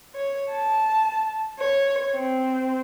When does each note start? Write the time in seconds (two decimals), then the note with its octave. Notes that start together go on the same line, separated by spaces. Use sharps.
0.15 C#5
0.51 A5
1.60 C#5
2.12 C4